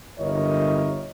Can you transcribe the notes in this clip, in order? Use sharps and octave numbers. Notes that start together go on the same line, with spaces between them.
G1 D3 E4 A#4 C#5 D#5